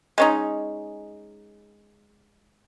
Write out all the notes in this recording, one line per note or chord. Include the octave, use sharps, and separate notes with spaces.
G#3 C#4 D#4